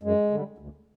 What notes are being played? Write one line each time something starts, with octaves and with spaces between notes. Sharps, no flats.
F#2 G#3
D3 G3
D2